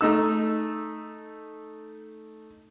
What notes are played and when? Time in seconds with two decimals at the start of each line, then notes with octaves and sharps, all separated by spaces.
0.01 A3 D#4 E6